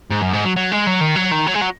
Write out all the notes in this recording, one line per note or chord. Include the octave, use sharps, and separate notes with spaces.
G#2
F#2
G#2
F#3
F#3
G#3
F#3
D#3
F#3
D#3
F#3
G#3
F#3